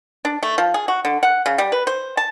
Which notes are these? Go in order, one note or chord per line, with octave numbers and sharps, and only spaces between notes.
D4
A3
F3
G#4
F#4
D3
F#5
C#3
G3
B4
C5
A5